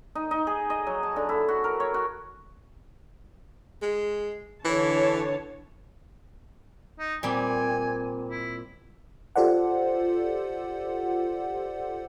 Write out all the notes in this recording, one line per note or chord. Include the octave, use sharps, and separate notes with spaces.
D#4
D#4
G#4
D#5
F#3
A5
D3
E4
F#4
A#4
C#5
F#4
G#3
D3 E3 C#5 A5
D#4
A#2 G3 C4 G#5
E4
F4 G4 A4 C5 D5 F#5